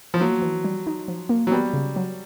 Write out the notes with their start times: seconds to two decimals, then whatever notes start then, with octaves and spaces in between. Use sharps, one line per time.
0.14 F3
0.21 F#3 A#3
0.42 E3
0.64 G3
0.87 D#4
1.08 F3
1.29 A#3
1.47 F#3
1.51 G3 B3
1.74 C#3
1.96 F#3